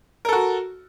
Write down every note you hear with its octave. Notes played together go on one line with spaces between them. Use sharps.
F#4 A4 A#4